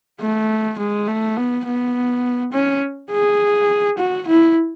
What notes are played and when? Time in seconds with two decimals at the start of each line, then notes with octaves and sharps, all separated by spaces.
0.21 A3
0.79 G#3
1.08 A3
1.37 B3
1.66 B3
2.53 C#4
3.12 G#4
3.98 F#4
4.28 E4